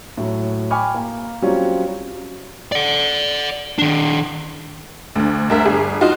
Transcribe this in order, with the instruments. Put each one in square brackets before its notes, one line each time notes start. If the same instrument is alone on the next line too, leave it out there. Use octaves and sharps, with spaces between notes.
[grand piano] A2 F#3
G5 G#5 B5 C#6 D6 F6
A#3
F#3 G3 C4 C#4 F4
[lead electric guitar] D5 F#5
D#3 D4
[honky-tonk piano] D2 D3
D2 A#4 E5
G1 G#4
D#4 F4 F#4